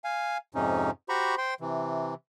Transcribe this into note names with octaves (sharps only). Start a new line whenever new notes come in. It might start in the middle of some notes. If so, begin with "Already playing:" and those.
F5 G#5
F2 G#2 C3 C#4 D#4
F#4 G4 C5 A#5 B5 C#6
C5 G5 C6
C3 E3